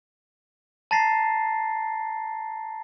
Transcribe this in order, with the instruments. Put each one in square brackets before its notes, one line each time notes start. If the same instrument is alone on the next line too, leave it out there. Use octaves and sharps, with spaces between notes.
[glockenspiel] A5 A#5 A6 A#6 C7